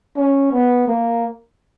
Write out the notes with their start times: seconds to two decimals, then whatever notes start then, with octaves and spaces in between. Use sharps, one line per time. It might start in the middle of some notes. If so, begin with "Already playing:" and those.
0.17 C#4
0.52 B3
0.88 A#3